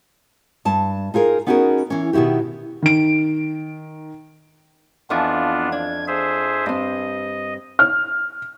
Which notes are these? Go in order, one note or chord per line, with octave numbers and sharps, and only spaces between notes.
G2 A5
D#4 F4 G#4 A#4
B3 C#4 D#4 F#4 G#4 A#4
E3 C#4
B2 D#3 E4 F#4 G4
D#3 D7
F2 E3 F3 B3 D4 F4
D4 G#6
G#4 C5 E5
G2 C4 D#5
F6